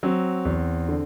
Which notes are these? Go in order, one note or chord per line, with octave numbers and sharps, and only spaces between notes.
F#3 C4
E2
D3